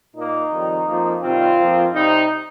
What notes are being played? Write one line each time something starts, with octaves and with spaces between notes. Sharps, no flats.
A#2 A#3 D#4
F2 D#3 G3
F2 F3 A#3
C3 D#3 G3 C4 F4
F2 F3 A#3
C3 G3 C4 D#4